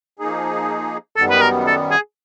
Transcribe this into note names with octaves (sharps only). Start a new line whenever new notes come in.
F3 A#3 D#4 G#4
F#2 D#3 G3 B3 A4
B4
A#4
A4
G#4